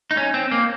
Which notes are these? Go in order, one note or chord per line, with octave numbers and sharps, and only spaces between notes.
D#4
C#4
C4
A#3